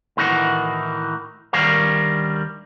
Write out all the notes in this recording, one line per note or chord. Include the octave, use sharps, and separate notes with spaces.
A2 D#3 E3 D#4 F#4
D2 D#3 G3 A#4 C#5 F5